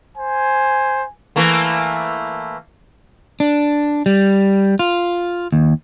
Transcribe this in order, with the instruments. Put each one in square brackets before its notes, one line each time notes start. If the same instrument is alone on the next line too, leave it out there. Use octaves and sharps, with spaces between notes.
[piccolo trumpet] C5 [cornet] G#5
[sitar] E3 A3 A#3
[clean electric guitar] D4
G3
F4
D#2